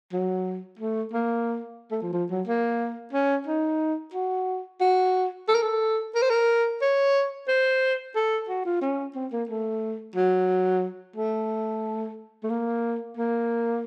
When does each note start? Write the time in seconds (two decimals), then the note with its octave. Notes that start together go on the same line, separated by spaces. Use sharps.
0.13 F#3
0.79 A3
1.13 A#3
1.91 A3
2.02 F3
2.13 F3
2.30 F#3
2.47 A#3
3.13 C#4
3.47 D#4
4.14 F#4
4.81 F#4
5.48 A4
5.55 A#4
5.62 A4
6.15 A#4
6.22 C5
6.30 A#4
6.81 C#5
7.48 C5
8.15 A4
8.49 F#4
8.65 F4
8.81 C#4
9.15 C4
9.32 A#3
9.49 A3
10.16 F#3
11.16 A3
12.43 A3
12.50 A#3
13.17 A#3